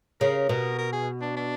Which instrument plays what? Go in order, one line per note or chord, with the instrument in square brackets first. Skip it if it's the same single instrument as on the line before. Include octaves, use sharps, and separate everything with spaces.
[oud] C#3 [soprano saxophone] A#4
[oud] B2 [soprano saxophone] A#4
[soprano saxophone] A#4
G#4
D4
D4